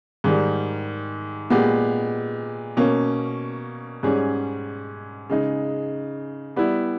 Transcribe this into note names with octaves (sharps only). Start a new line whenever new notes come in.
G#2 D#3 G3
A#2 G#3 B3 G4
B2 A#3 C#4
G#2 G3 C#4 G#4
C#3 G#3 D#4
G3 B3 E4